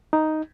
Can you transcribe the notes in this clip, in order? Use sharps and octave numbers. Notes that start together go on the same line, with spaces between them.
D#4